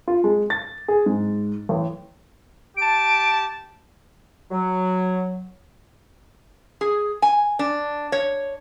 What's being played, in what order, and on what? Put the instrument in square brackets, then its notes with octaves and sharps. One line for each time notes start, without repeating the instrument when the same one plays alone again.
[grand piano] F4
G#3
A6
G#4
G#2
A1
[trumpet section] G4 A5 [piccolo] D7
[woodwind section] F#3
[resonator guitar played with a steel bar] G#4
G#5
D4
C#5